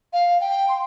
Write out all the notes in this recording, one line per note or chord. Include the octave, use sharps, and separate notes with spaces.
F5
G5
C6